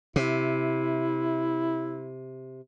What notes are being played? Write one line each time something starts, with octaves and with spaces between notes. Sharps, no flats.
C3 E4